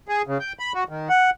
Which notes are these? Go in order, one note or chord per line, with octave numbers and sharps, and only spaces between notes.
G#4
C#3
G5
B5
F#4
D#3
F#5